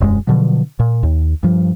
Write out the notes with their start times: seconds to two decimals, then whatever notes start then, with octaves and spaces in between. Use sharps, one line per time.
0.01 E1 F#2 G#3
0.27 B2 D3 F3 F#3
0.79 A#2
1.03 D#2
1.43 G2 F3